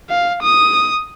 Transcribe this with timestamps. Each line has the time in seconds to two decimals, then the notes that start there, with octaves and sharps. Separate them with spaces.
0.10 F5
0.43 D#6